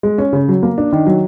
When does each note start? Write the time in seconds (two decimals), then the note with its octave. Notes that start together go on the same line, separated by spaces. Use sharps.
0.03 G#3
0.18 C#4
0.33 C#3
0.48 F#3
0.63 A#3
0.78 D4
0.93 D#3
1.06 F#3